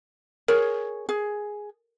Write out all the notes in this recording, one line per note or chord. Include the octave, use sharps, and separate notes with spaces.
G#4 A#4 C#5
G#4